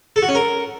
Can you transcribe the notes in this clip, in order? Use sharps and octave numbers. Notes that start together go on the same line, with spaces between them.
A4
F#4
C#4
A#4